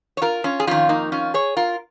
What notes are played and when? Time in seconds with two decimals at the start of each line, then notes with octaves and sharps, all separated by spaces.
0.17 C#5
0.22 F4 A#4
0.44 C#4 F4
0.60 G#4
0.67 F2 D#3 C#4 F4
0.89 A#3 D#4
1.12 C#4 F4
1.34 G#4 C#5
1.57 F4 A#4